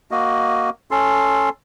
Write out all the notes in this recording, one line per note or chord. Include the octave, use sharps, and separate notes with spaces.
A#3 F#4 D#5
C#4 A4 C6